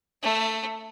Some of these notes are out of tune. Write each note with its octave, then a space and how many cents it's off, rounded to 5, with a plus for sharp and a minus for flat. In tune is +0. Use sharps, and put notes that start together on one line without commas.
A3 +15 E5 +0